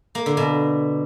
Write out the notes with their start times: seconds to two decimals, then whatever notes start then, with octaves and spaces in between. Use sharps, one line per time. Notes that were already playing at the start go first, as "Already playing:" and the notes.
0.15 A#3
0.26 D3
0.37 B2